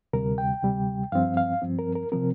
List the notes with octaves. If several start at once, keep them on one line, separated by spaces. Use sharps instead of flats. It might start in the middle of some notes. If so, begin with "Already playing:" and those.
D2 C3 G3 A#4
G5
D2 C3 G3
G2 F3 C4 F5
F5
G2 F3 C4
A#4
A#4
C3 F3 C4 A#4